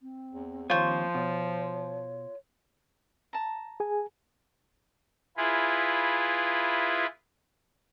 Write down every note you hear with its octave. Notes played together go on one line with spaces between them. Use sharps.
C4
E2
D#2 F3 F4 C5 C#5
B2 C#5
A5 A#5
G#4 G#5
E4 F4 G#4 B4